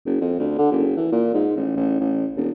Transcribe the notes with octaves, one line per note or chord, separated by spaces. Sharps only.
F#1
F2
D2
D3
F#1
E3
A#2
G#2
A1
A1
A1
E1